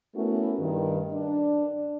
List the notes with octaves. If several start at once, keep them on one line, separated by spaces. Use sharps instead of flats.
A3 B3 C#4 E4 F#4 A#4
G2 D#3
D4